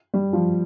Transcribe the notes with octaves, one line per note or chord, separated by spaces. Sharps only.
G3
F3